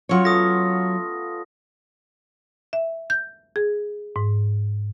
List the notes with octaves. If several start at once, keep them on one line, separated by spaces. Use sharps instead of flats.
F#3 C#4 F4 C#5 F#5
A3 B3 D#6 A#6
E5
G6
G#4
G#2